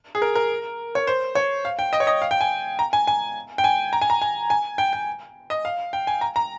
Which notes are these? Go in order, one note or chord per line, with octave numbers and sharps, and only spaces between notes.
G#4
A#4
A#4
C#5
C5
C#5
F5
G5
D#5
C#5
D#5
F5
G5
G#5
A#5
G#5
G#5
G5
G#5
A#5
G#5
A#5
G#5
G#5
G5
G5
D#5
F5
G5
G#5
A#5
A#5